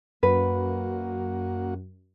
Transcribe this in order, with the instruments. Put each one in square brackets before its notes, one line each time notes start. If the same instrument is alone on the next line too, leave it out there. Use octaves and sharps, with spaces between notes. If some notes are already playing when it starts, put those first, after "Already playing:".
[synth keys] F#2 [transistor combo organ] A#3 F#4 [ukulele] B4